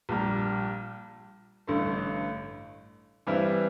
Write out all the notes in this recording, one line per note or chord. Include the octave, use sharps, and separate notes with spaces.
A#1 A#2 G3
A1 G2 D3 A3
G2 E3 G3 C4 E4